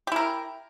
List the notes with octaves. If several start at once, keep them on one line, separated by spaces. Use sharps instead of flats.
E4 G4 A#4